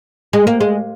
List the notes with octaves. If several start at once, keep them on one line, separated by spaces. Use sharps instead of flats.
G#3
A#3
G#3